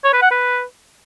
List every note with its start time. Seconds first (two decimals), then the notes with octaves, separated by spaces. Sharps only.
0.04 C#5
0.13 B4
0.22 F#5
0.31 B4